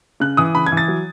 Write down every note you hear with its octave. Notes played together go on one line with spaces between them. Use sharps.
C#3 F#6
E3 D#6
C#3 B5
G#6
E3
A6
F#3